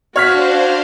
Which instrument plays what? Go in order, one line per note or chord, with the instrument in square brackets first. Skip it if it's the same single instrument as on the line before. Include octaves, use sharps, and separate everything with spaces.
[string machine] D4 C5 F5 [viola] F#4 [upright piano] C#5 F6 B6